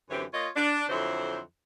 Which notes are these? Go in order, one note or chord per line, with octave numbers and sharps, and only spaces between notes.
F#2 D3 E3 C4 G4 C#5
A#3 F4 C#5 D#5
D4
F2 D3 F#3 E4 C5